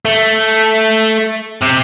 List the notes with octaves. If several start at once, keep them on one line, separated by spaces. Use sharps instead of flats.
A3
C3